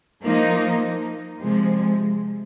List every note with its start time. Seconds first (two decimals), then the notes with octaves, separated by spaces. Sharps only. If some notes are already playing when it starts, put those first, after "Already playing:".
0.22 F3 A#3 D#4
1.40 C3 F3 G#3